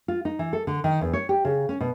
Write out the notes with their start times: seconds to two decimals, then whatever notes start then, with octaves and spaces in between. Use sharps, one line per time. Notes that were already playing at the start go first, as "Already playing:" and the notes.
0.08 F4
0.25 D#4
0.39 E3
0.53 A4
0.67 D3
0.84 D#3
1.01 E2
1.13 C#5
1.29 G4
1.45 C#3
1.69 C#4
1.80 B2